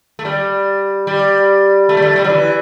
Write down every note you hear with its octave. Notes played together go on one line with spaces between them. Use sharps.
A3
G3
G3
A3
G3
A3
G3
F#3
E3